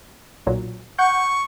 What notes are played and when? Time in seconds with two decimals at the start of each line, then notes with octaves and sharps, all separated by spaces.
0.46 B1 A#2 F#3
0.99 F#5 C#6 G6